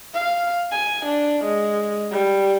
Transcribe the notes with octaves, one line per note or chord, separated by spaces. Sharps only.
F5
G#5
D4
G#3
G3